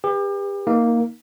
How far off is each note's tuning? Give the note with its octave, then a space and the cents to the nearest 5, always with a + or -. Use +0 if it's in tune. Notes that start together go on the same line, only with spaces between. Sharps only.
G4 +35 B4 -10
A#3 +0 D#4 +15